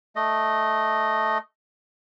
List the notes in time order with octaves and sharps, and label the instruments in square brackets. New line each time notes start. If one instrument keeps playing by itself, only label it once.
[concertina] A3 D#5